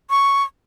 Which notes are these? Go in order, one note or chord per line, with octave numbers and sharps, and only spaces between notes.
C#6